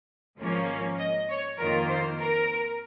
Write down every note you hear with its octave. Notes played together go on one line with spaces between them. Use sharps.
G#1 G#2 F3 A#3 C#4
D#5
C#5
F2 D#3 A#3 F4 A#4
C5
A#4